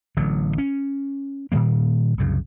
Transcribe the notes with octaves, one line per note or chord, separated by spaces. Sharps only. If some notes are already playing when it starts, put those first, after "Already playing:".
A1 D3 F#3
C#4
A#2 D#3 G3 A#3
C2 F#2 C#3